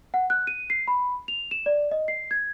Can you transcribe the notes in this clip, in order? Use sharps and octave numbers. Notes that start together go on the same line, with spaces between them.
F#5
F#6
D#7
C7
B5
F7
E7
D5
D#5
C7
G#6